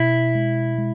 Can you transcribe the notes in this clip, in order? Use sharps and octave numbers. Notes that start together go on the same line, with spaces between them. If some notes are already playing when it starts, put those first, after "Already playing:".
Already playing: B2 E4
G#3
G#3